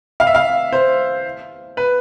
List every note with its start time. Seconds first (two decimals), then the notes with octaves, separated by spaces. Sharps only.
0.20 F5
0.27 E5
0.35 F5
0.73 C5
1.77 B4